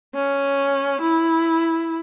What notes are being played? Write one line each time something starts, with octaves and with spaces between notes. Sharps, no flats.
C#4
E4